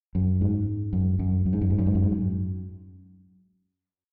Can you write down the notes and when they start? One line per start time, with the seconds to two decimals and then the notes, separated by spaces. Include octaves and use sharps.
0.15 F#2
0.41 G#2
0.93 F#2
1.19 F#2
1.46 F#2
1.53 G#2
1.61 F#2
1.70 G#2
1.78 F#2
1.86 G#2
1.95 F#2
2.03 G#2
2.12 F#2